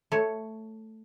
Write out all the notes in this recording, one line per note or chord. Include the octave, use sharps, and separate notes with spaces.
A3 C#5